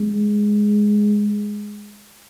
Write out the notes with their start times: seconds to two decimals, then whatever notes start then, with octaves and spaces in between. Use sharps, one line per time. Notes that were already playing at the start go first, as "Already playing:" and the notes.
Already playing: G#3